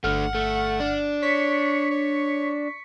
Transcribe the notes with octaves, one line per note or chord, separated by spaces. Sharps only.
G1 D3 A3 F#5 F6
A3
D4
C#5 C#6 B6 C#7
C#5